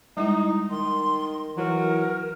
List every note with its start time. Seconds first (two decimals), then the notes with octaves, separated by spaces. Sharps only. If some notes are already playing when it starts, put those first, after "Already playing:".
0.17 G3 G#3 D#4 E4
0.70 D#3 C6
1.57 E3 F#3 A#4